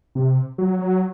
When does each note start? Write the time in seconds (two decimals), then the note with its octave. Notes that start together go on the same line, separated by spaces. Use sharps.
0.15 C3
0.58 F#3
0.79 F#3